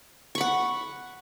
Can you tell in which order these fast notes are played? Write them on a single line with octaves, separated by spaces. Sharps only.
C#6 B5 F#5